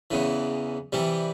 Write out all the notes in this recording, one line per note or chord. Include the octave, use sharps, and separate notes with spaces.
E2 C#3 E3
C3 E3 G3